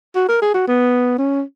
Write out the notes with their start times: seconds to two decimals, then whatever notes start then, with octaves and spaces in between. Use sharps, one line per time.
0.16 F#4
0.29 A#4
0.42 G#4
0.54 F#4
0.67 B3
1.18 C#4